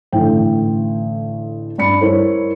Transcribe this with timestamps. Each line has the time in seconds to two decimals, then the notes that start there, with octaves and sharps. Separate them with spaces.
0.12 A1 D3 G5
1.78 G2 D5 B5 C#7
2.01 E4 A#4 C5 C#5